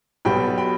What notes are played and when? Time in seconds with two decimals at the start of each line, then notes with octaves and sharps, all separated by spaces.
0.25 B1 B2 G3 B3 G5 B5
0.58 G5 B5